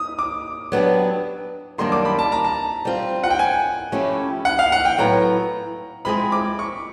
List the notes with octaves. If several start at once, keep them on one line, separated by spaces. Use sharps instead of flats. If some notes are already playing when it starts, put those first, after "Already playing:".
Already playing: D#6
D6
F#3 B3 D4 G4
F#2 D#3 G3 A#3 D4 C6
D6
B5
A5
A#5
A5
G3 C4 F4
F#5
G5
G#5
F3 A3 C#4 E4 G4
F#5
F5
F#5
G5
A2 F#3 B3 A#5
F3 G#3 C4 E4 G#4 B5
D6
C#6